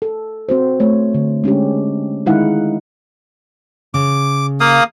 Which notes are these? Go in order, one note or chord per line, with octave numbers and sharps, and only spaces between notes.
A4
C4 F#4 C5
A3 C#5
D3
G#3 C#4 D4 G4
D#3 G#3 D#4 E4 F5 F#5
C#3 D6
A#3 F5 D#6